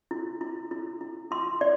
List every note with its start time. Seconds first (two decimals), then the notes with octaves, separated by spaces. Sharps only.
0.11 E4
0.41 E4
0.71 E4
1.01 E4
1.31 E4 C6
1.61 E4 D5